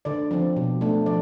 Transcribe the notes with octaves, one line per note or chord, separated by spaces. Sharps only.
D3 D5
F3 C4
B2
A3 D4
F3 D5